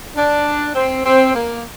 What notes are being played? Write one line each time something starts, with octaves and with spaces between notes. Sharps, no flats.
D4
C4
C4
A#3